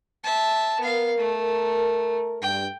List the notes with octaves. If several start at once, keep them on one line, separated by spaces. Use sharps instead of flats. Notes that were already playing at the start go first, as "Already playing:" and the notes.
E5 A5
B3 A#4 F5
A3
G2 G5